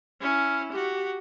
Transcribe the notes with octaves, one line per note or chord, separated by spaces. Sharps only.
C#4 E4
F#4 G4